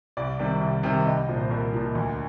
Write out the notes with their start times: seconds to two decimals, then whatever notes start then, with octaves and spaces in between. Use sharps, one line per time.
0.17 C2 D5
0.39 C3 D#3 G3
0.61 C2
0.83 C3 D#3 G3
1.06 C2 D#5
1.28 A#2 F3 C5
1.40 C5
1.51 C2 A#4
1.74 A#2 F3
1.95 D2